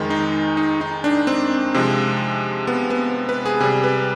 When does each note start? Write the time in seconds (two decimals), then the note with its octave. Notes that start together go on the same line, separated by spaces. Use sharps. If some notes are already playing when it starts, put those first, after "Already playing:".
Already playing: F2 D#3 G#3
0.10 D#4
0.57 D#4
0.81 D#4
1.04 D4
1.27 C4
1.74 C3 F3 G#3
2.67 B3
2.90 B3
3.29 B4
3.46 G#4
3.60 C3 G#4
3.63 G3
3.84 B4